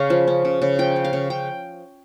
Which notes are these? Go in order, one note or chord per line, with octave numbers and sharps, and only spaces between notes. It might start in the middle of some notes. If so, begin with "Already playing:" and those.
Already playing: C#3 C#4 F5
F3
C#4
C#3
C#3
F3 G5
C#4
F5
C#3
C#3 G5